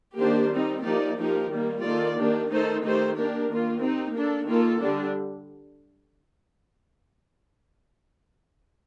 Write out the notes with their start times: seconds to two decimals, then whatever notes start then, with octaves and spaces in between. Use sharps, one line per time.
0.18 D#3 A#3 D4 G4 C5
0.51 G3 C4 D#4
0.84 F3 A#3 D#4 G4 D5
1.18 F3 A#3 D#4 G4 A#4
1.51 D#3 G3 A#3
1.83 D#3 A#3 F4 A4 D5
2.16 D#3 A#3 D4 G4
2.49 D#3 A3 D#4 A4 C5
2.83 D#3 A3 D#4 G4 C5
3.16 A#3 D4 G4 A#4
3.49 D#3 A#3 F4
3.81 C4 D#4 G4
4.14 A#3 D4 A4
4.48 D#3 A#3 F4 A4
4.81 D3 G3 D4